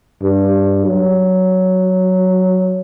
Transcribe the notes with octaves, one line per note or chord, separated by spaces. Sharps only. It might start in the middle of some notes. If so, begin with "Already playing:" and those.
G2
F#3